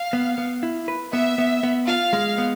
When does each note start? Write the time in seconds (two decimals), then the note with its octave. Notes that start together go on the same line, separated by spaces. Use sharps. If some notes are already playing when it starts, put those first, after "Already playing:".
Already playing: F5
0.13 B3
0.38 B3
0.63 E4
0.88 B4
1.13 B3 E5
1.38 B3
1.63 B3
1.88 F4 F5
2.13 G#3
2.38 B3